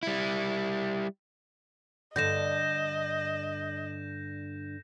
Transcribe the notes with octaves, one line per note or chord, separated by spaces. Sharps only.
G3 E4
G2 D3 D#5 G6 A#6 E7